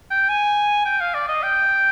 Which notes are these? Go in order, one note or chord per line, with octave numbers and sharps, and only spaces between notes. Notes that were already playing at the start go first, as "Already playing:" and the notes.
G5
G#5
G5
F5
D5
D#5
G5